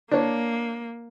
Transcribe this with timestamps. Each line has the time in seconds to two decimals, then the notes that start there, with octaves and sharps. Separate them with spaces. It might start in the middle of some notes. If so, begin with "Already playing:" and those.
0.11 A#3 D4 C#5